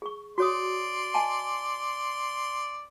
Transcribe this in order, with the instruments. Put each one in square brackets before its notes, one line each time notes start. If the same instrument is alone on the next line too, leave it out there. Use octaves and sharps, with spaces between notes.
[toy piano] G#4 C#6
[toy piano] F#4 C#5 D#6 [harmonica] D5 C6
[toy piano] D#5 G#5 A5